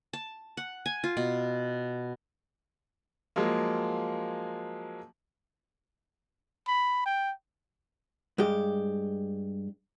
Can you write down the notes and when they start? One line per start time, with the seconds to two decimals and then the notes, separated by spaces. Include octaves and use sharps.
0.13 A5
0.57 F#5
0.86 G#5
1.04 F4
1.17 B2
3.36 F3 F#3 G#3 A#3
6.68 B5
7.06 G5
8.38 G2 G#3 G4